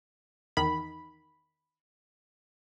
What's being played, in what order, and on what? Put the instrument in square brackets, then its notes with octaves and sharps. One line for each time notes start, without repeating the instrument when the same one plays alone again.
[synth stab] E2 D#3 B5